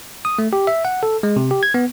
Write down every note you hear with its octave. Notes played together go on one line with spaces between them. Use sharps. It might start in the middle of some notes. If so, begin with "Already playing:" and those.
D#6
A3
G4
E5
F#5
A4
G#3
C3
G4
G#6
B3